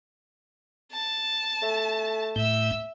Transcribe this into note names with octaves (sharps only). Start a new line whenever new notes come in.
A5
A3
A2 E5 E6 G6